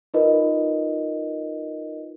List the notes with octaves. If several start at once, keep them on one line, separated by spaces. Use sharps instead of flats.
D#4 F4 A#4 B4 D#5